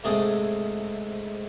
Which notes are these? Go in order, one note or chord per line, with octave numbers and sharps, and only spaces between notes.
G#2 C3 A3 G#4 G5 D#6